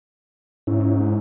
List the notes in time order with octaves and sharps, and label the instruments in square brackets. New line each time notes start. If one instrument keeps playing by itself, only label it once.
[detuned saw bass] G#2 [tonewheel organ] C#4 E4